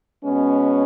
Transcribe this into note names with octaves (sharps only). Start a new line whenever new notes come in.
B2 G#3 B3 C#4